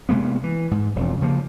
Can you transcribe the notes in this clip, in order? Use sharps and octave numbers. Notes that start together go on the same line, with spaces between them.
C3 G#3 A#3 B3
E3
G#2
E1 F2
C#3 F3 A#3